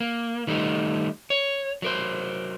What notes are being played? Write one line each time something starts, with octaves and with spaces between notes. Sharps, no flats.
A#3
D#3 G3 A3 D#4
C#5
F#3 A#4 C5